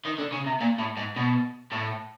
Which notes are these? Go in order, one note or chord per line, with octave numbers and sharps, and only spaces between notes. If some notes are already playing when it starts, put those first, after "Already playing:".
D#3
D3
C#3
C3
A#2
A2
G#2
B2
A2